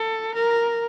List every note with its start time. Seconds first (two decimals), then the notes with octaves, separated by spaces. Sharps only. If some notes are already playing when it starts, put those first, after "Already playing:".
Already playing: A4
0.34 A#4